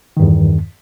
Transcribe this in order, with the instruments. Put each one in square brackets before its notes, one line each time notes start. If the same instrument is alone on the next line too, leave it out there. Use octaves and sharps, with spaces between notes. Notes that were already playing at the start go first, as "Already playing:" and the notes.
[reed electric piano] D#3
G2
E2